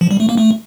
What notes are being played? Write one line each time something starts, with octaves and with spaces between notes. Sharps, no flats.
F3
G3
A3
A#3
A3